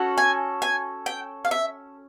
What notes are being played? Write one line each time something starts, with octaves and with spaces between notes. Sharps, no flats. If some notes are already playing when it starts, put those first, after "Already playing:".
Already playing: C#4 F#4 A4
G#5
G#5
G5
F5
E5